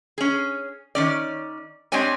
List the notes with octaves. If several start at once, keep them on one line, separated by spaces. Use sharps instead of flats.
C#4 G#4
D#3 C#4 D5
G#3 C4 D4 G4 C#5 G#5